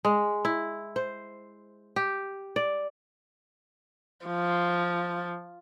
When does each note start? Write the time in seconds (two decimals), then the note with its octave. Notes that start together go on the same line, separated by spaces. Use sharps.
0.05 G#3
0.45 E4
0.96 C5
1.96 G4
2.56 D5
4.26 F3